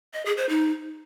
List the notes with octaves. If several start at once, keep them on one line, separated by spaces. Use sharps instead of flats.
D#5
G#4
C5
D#4